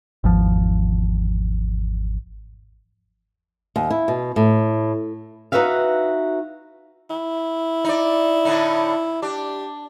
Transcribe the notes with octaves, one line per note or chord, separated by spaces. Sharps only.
G#1 E2 F3
D#2
E4
B2
A2
D#4 E4 F#4 B4 E5 F5
E4
D#4 D5
A2 D3 D#4
D4 G4